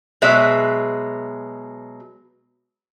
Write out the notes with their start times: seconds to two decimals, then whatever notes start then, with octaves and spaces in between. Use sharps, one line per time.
0.22 B2 F#3 G#3 E5